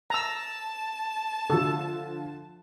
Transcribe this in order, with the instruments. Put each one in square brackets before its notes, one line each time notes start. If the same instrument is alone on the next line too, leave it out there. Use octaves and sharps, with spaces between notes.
[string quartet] A5 [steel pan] A#5 E6
[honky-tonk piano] D3 F3 [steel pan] A4